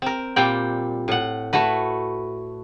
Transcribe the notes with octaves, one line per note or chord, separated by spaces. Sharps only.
C4 A#4
A#2 G3 C4 G5
A2 F#5
A3 E4 F#4 B4